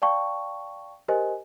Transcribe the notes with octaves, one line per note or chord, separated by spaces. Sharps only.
D5 F5 G5 A5 C#6
G4 A#4 C5 D#5 G#5